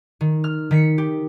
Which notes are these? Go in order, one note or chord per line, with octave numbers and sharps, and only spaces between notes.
D#3
F6
D#3 B6 C#7
G4